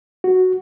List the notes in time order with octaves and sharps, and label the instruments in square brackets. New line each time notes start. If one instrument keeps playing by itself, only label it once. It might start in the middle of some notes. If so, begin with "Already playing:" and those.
[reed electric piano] F#4